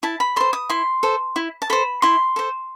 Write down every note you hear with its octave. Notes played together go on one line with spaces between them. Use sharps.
E4 A5
B5
A4 C5 C6
D#6
E4 C6
A4 C5
E4
A5
A4 C5 B5
E4 C6
A4 C5